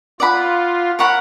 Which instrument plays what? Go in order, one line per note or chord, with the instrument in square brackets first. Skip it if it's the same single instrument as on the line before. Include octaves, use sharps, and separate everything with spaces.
[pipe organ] F4 [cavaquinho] D5 F#5 B5
[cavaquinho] A#4 C#5 F#5 B5